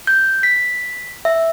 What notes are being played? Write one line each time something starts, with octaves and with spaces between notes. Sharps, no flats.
G6
B6
E5